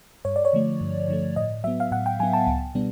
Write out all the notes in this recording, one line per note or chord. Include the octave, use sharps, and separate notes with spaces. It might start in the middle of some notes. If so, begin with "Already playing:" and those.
G2 C#5
D5
C#5
D3 F3 A3
G2
D3 F3 A3
A2 D#5
F#3 B3 E5
F5
A2 F#5
G5
F#3 B3 G#5
A5
C#2
B2 G3 B3 D4